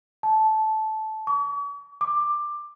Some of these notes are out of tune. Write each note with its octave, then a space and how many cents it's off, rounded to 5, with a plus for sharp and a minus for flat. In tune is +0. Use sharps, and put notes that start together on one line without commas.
A5 -15
C#6 +45
D6 +15